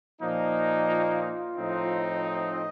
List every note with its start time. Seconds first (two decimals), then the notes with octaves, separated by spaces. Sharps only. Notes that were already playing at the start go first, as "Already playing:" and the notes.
0.21 A#2 F3 A#3 D#4
0.89 F4
1.57 A2 F3 C4 D#4
2.25 D#5